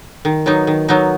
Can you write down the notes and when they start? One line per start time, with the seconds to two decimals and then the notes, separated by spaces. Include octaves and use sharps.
0.25 D#3
0.46 F#3 B3 D#4
0.67 D#3
0.88 F#3 B3 D#4